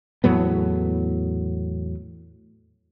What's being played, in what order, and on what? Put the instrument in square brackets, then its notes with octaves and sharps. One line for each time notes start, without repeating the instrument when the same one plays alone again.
[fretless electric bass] E2 A2 F#3 B3